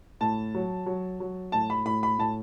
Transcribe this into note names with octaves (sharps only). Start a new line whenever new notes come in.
A2 A5
F#3
F#3
F#3
A2 A5
B5
A2 B5
B5
A2 A5